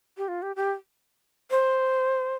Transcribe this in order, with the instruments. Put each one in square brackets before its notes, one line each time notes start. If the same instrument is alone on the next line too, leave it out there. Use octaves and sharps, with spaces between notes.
[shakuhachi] G4
F4
G4
G4
C5